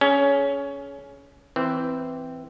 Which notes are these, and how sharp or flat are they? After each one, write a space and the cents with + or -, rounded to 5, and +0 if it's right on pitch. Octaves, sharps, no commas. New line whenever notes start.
C#4 +15 G#4 +30
E3 +0 C4 -10